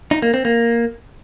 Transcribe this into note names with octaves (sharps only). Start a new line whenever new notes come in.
D#4
A#3
C4
A#3